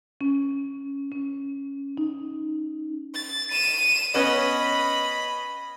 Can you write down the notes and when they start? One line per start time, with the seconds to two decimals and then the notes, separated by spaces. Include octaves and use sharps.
0.21 C#4
1.12 C#4
1.97 D#4
3.14 A6
3.51 D#7 E7
4.14 B3 C#4 B4 D#5 B5